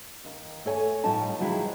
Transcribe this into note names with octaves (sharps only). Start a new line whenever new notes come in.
D#2
A3 A4 C#5 G#5
A2 F3 G3 C#4 D#4 A5
C3 D#3 F3 F#3 G#3 E4